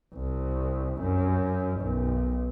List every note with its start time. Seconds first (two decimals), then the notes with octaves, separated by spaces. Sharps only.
0.15 C2
1.02 F#2
1.81 B1